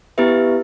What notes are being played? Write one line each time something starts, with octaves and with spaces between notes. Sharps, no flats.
B3 E4 G4 B4 E5